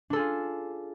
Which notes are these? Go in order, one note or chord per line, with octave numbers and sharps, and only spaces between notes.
D4 F4 G#4 A4